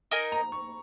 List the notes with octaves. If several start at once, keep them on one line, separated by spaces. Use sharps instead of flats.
D#4 A#4 D#5 G#5
A#5
C#6